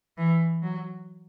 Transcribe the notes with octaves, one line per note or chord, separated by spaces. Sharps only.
E3
F#3